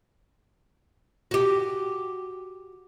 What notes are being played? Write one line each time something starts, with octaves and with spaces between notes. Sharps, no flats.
F#4 G4